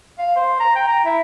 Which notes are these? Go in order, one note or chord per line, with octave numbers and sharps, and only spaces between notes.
F5
C5
A#5
G5
A#5
E4